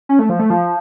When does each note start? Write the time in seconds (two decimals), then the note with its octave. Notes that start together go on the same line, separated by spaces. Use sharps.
0.09 C#4
0.19 A3
0.29 F3
0.39 A3
0.50 F3